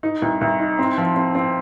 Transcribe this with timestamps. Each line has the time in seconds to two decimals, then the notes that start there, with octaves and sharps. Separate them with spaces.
0.03 D#4
0.22 C2
0.41 C2
0.60 D#4
0.79 C4
0.98 F3
1.16 C4
1.35 C4